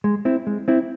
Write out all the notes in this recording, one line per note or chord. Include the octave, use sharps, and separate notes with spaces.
G#3
C4 E4
G#3
C4 E4